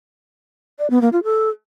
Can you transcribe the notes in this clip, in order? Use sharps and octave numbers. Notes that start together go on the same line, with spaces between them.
D5
B3
A#3
F4
A4